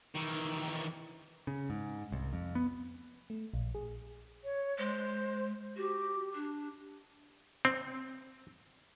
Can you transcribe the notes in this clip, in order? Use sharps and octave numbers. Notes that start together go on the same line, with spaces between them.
D#3 E3
C#3
G#2
C2
F2
B3
A3
A#1
G#4
C#5
G#3 C5
F#4 G4
D4
C4